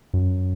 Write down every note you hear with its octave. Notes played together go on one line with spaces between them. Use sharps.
F#2